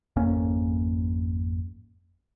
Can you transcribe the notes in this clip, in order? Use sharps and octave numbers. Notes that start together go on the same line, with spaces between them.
G#1 F2 A#3 C#4